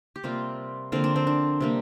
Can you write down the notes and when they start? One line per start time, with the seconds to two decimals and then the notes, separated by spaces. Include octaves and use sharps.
0.16 G4
0.24 C3 G3 A#3 C4 F4
0.92 D3 F3 A#3 C4 F4
1.04 D4
1.16 C4
1.27 D4
1.60 C3 G3 A#3